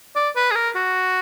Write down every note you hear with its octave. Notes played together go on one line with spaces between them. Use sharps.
D5
B4
G#4
A#4
F#4